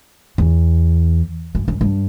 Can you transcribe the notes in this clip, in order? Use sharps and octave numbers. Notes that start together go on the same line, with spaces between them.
E2
F#2
F#2
G2